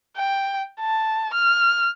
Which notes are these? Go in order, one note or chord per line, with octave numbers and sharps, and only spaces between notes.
G5
A5
F6